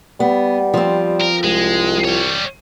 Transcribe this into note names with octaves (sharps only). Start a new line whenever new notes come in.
G3 B3
F3 C4
A#4
C2 G#3
G3 C#5